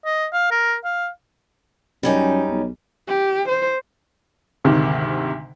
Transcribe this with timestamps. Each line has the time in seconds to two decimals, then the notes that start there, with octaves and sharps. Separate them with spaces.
0.05 D#5
0.33 F5
0.51 A#4
0.84 F5
2.03 F#2 G3 C#4 D#4
2.50 B1
3.08 G4
3.49 C5
4.65 D2 G#2 C3 D#3